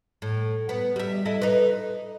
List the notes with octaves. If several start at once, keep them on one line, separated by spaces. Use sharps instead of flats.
A2
B3
G3 E5
E4 A4 D#5
D#4 B4